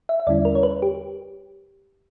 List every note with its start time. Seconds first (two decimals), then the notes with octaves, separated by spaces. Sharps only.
0.09 E5
0.20 E5
0.27 E2 D3 G3 C#4 E4 D5
0.45 A#4
0.55 C#5
0.63 B4
0.82 G4